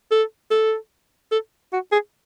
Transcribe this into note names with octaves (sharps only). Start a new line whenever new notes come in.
A4
A4
A4
F#4
G#4